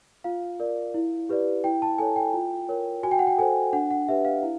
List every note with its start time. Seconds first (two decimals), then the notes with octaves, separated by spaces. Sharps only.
0.24 F4 F5
0.60 A#4 D5
0.94 E4
1.29 G4 B4 D5
1.64 E4 G5
1.82 A5
1.98 A4 C#5 G#5
2.16 G5
2.34 F4
2.69 A#4 C#5
3.03 F#4 G#5
3.11 G5
3.19 F#5
3.27 G5
3.38 A4 C5 G#5
3.73 D4 F#5
3.91 F#5
4.08 G4 B4 E5
4.25 F5
4.43 E4